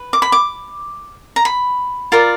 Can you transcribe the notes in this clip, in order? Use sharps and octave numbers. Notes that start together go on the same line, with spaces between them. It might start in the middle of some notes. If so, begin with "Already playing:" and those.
Already playing: B4
D6
B5
D6
A#5
B5
F4 A#4 D5